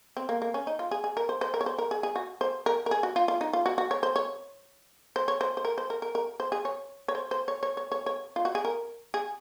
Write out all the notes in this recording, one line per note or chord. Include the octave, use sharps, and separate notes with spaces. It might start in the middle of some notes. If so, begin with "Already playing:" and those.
C4
A#3
A#3
C#4
D#4
F4
G#4
G#4
A#4
C5
C5
A#4
C#5
C5
A#4
G#4
G#4
F#4
C5
A#4
A#4
G#4
F#4
F4
F4
D#4
F4
F#4
F#4
C#5
C5
C#5
C5
C#5
C5
C5
A#4
C5
A#4
A#4
A#4
C5
G#4
C#5
C#5
C5
C5
C#5
C#5
C#5
C#5
C#5
F4
F#4
G#4
A#4
G#4